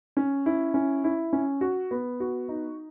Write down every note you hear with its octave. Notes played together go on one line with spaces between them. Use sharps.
C#4
E4
C#4
E4
C#4
F#4
B3
F#4
D#4